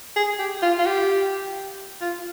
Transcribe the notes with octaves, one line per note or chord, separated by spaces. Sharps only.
G#4
G4
F4
F4
G4
F4